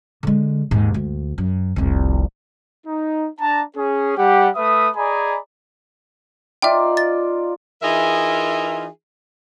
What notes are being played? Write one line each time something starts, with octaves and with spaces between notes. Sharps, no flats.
D3 G#3
D#2 G#2
D2
F#2
F1 C2
D#4
D4 A5 A#5
C#4 G#4
G3 G4 F#5
A3 B4 E5 D#6
G#4 D5 D#5 G#5 A#5 B5
D#4 F4 D5 E5 G5
A6
E3 D#4 F4 G#4 A#4 E5